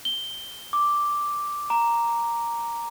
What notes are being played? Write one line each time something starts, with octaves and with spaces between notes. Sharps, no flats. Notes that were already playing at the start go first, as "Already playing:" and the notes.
G7
D6
A#5